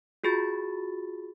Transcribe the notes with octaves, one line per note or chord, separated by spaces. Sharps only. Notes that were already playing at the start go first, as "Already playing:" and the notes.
F4 F#4 G#4 B5 A6